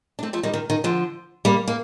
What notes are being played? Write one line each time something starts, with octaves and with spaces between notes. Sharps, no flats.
D4
A3 C4
F3 A3
D#3 G3
D#3
D#3
D3 F3
G3 A#3
A#3